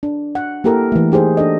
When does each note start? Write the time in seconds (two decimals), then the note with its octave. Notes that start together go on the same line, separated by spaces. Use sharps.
0.03 D4
0.35 F#5
0.64 A#3 E4 G4 A4 A#4
0.92 E3 A3
1.12 D#4 G4 G#4 C5
1.37 D4 A4 D#5